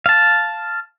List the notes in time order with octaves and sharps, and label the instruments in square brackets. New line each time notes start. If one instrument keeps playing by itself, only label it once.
[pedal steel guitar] F5 A5